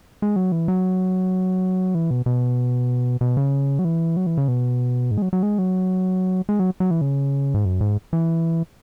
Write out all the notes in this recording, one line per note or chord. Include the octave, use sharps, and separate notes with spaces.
G#3
F#3
E3
F#3
E3
B2
B2
B2
C#3
F#3
E3
F#3
E3
C#3
B2
G#2
G#3
F#3
F#3
G#3
F#3
G#3
F#3
F#3
E3
C#3
G#2
F#2
G#2
E3